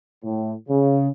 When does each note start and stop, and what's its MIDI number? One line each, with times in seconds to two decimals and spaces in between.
0.23 0.53 45
0.68 1.08 49